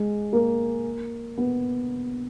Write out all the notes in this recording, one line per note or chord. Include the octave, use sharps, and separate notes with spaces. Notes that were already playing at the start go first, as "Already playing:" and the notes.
Already playing: G#3
A#3
B3